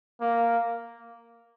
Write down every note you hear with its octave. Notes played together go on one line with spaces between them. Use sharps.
A#3